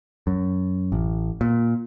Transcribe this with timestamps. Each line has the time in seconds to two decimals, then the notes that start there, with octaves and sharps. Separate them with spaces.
0.27 F#2
0.92 A1
1.41 A#2